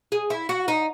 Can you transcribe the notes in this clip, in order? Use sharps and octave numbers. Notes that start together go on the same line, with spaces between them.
G#4
E4
F#4
D#4